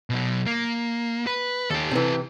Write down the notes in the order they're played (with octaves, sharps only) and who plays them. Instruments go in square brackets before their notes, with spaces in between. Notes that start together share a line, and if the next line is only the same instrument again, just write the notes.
[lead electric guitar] B2 F#3
A#3
B4
[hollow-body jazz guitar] D#2 [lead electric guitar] G4 A4
[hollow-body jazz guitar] C3 E3